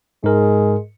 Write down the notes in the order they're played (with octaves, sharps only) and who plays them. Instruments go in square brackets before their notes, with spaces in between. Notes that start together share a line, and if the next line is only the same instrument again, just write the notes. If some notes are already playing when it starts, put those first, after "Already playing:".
[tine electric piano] G#2 A#4 [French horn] G#3